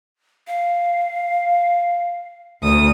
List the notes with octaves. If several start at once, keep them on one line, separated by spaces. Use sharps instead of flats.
F5
D2 D#6